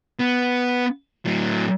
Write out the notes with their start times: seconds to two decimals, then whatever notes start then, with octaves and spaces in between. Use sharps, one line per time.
0.20 B3
1.25 A2 F#3